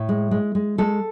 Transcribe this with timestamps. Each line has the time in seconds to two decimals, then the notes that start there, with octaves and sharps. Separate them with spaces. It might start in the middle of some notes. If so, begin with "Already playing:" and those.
Already playing: A2
0.09 G#3
0.31 G#3
0.55 G#3
0.78 G#3 A4